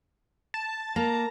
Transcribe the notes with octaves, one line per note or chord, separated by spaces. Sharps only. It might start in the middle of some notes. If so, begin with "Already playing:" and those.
A5
A#3 A5 A#5